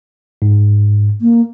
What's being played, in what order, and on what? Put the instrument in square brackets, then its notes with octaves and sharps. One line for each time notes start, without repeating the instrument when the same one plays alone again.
[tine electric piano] G#2
[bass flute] A#3